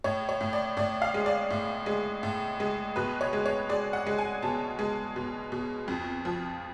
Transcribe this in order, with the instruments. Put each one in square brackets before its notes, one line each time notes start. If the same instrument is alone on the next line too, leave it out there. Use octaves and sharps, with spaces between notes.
[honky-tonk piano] A2 C#5
C#5
A2
D5
A2 D5
F5
G#3
D5
A2
G#3
A2
G#3
B2 B4
C#5
G#3
C#5
G#3 D5
F#5
G#3
G#5
B2 A5
G#3
B2
B2
F2
F3